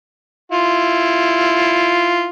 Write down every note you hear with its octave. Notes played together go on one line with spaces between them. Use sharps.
E4 F4